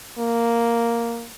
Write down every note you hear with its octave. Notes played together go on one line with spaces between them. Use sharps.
A#3